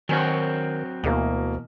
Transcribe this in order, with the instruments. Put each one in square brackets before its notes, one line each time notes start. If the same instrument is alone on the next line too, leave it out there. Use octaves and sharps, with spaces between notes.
[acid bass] D#3 [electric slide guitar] F#3 C4 F#4 [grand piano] G#5
[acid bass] D2 [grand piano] B2 E3 A#3